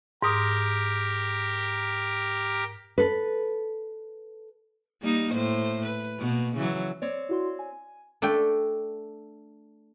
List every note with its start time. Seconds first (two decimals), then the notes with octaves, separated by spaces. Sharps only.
0.22 G#2 G4 A#4 D#6
2.98 A4 B4
5.02 G3 A#3 D#4
5.34 A2 C5
5.86 B4
6.19 B2 A#3
6.56 C#3 E3 F#3
7.02 C4 C#5 D5
7.29 E4 F#4 C6
7.59 G#5
8.22 A3 D4 A4 G5